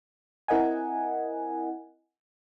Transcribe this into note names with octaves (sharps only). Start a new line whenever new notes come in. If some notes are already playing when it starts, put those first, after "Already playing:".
C4 E4 A#4 D#5 F#5 G#5